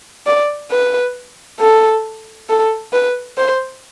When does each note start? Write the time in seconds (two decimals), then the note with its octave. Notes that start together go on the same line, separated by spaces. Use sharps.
0.27 D5
0.71 B4
1.60 A4
2.49 A4
2.93 B4
3.38 C5